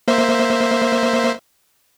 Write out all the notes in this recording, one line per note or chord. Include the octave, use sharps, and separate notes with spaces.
A#3 C5 E5